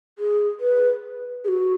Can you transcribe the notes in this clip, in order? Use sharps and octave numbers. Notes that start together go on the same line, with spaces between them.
G#4
B4
G#4
F#4